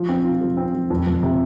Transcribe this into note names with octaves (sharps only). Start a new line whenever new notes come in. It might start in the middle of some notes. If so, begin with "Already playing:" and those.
Already playing: F3
C4
F4
F3
C4
F3
F2
F2
C3